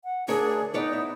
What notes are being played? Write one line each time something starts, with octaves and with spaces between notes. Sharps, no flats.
F#5
D2 D4 G#4 A#4 C#5
B3 D#4 B4 C#5 D5
E4